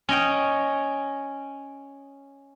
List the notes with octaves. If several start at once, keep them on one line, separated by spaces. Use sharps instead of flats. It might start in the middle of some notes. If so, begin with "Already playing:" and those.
C#4 D#5 G5